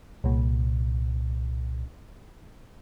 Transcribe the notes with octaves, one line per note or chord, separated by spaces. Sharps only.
C2 A#2